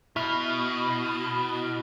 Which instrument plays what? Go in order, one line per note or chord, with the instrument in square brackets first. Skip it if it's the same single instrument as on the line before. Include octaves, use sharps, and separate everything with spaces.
[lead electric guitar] B2 [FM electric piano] E4 B5 F6